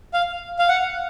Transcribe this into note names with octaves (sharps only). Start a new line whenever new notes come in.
F5
F5
F#5